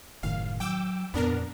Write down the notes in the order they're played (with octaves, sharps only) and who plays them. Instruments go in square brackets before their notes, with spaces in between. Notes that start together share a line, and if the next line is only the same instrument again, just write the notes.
[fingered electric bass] F#1 A2 D#3 [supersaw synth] F5
[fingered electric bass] F#3 [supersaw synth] G5 D6 E6
[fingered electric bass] F2 A#2 [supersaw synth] B3 D4 A#4